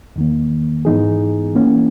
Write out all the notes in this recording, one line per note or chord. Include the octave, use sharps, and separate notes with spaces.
E2 D#3 A#3
G#2 E3 B3 D#4 G#4
E3 A#3 C#4